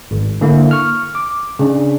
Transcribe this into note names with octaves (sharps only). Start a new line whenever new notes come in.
G#1
D3 A#3 E4
C#6 F6
D6
C#3 D4